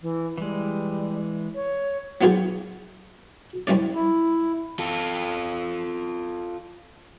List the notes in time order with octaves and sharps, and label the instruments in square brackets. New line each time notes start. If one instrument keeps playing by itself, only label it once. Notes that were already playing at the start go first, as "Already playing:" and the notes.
[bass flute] E3
[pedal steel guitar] E3 G#3 [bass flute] G3
[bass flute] C#5
[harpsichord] F#3 B3 F4 G4 G#4
C2 G3 C#4 D5
[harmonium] E4
[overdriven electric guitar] F4 A4